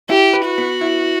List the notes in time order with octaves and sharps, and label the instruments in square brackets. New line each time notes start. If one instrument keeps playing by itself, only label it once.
[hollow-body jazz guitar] E4 [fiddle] G4
[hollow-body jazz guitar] B4
[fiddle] F#4
[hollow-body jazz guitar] B3
E4